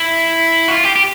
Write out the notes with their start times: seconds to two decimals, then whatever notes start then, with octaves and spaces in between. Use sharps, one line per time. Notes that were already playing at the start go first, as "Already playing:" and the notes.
Already playing: E4
0.68 F#4
0.72 F4
0.84 G4
0.96 G4